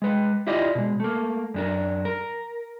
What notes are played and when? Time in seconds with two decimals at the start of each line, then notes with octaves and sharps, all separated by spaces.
0.02 G#3 B4
0.47 E4 F4 G4 D5 D#5
0.75 B2 G#3
1.00 A3 A#3
1.54 F#2 D4 A#4
2.05 A#4